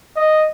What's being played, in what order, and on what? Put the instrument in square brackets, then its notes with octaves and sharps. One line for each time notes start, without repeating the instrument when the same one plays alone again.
[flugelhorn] D#5